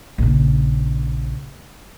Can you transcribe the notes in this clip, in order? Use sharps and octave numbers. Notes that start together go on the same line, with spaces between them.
A#1 C#3